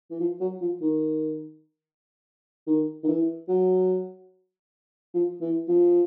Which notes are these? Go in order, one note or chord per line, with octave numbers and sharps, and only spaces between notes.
E3
F3
F#3
F3
D#3
D#3
D#3
E3
F#3
F3
E3
F3